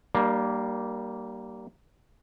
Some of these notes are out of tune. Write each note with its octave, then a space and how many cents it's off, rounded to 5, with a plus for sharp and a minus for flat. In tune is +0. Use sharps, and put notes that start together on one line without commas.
G3 -20 A#3 +0 D4 +40